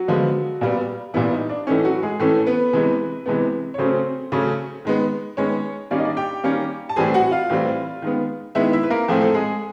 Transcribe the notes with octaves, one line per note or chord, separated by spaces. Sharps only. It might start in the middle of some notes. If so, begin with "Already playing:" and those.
Already playing: F#3 F#4
D3 F3 G#3 B3
A#2 G3 B3
A#2 E3 G3 B3 E4
D#4
D4
A2 E3 A3 C#4 D#4
F#3 F#4
G#3 G#4
A2 E3 A3 C#4 A4
B3 B4
C3 E3 G#3 B3
C3 E3 G#3 B3
C#5
C#3 F#3 A3 C4 C#4 C5
C#3 F#3 A3 C#4
D#3 G#3 B3
D#3 G#3 B3 C#4 C#5
D#3 G3 A#3 C#4 D5
D#5
D4 D5
G4 G5
D#3 G3 A#3 C#4
A5
A2 E3 G3 C4 G#4 G#5
F#4 F#5
F4 F5
A2 E3 G3 C4
D#3 G#3 B3
D#3 G#3 B3 E4 E5
E4 E5
B4
A#3 A#4
A2 F3 A3 C4 G#4
A4
G#3 G#4